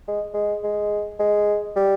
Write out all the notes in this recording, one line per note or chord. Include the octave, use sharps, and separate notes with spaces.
G#3
G#3
G#3
G#3
G3